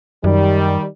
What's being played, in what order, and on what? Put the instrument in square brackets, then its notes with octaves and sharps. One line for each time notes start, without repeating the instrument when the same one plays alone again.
[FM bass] F#2 [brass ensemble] D#3 G3